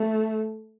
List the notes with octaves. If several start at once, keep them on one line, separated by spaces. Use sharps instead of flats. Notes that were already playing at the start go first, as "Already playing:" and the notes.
Already playing: A3